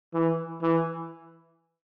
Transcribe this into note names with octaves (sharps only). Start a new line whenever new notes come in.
E3
E3